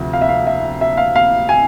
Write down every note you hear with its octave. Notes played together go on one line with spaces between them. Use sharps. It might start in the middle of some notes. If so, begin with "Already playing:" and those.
Already playing: D2 C3 F3
F5
E5
F5
E5
E5
F5
F5
G#5